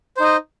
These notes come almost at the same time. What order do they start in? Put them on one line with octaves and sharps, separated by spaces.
C5 D#4 D#5